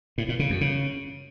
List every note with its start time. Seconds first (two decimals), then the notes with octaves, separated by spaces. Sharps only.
0.18 A2
0.29 A#2
0.39 C#3
0.50 F#2
0.61 C#3